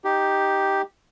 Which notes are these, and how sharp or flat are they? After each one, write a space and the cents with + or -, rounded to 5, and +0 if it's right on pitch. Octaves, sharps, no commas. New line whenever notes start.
D#4 +0 G4 +0